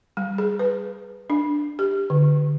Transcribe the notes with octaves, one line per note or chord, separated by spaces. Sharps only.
G3
G#4
B4
D4
G4
D3